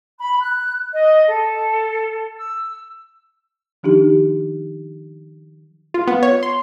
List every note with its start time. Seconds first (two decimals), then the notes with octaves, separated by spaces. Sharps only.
0.19 B5
0.40 F#6
0.92 D#5
1.27 A4
2.38 E6
3.83 D#3 F3 D4 D#4 G4
5.94 F4
6.08 B3
6.23 C#5
6.43 C6